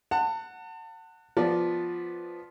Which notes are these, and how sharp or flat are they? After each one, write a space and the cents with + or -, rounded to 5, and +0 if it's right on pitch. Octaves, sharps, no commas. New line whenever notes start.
F#5 +0 A5 +35
F3 +0 B3 +0 D5 +0